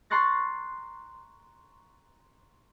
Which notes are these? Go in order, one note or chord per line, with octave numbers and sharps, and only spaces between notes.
A#5 C6 C#6 F#6 A6 A#6